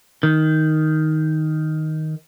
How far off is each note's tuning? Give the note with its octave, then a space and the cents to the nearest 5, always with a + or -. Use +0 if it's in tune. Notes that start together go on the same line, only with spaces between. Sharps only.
D#3 +5